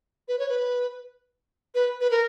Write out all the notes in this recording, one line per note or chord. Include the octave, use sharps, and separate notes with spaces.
B4
C#5
B4
B4
B4
A#4